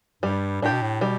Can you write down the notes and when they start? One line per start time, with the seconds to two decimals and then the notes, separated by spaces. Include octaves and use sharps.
0.23 G2 G3
0.62 A2 D4 G4
0.72 B2
0.82 A2
1.01 B2 G3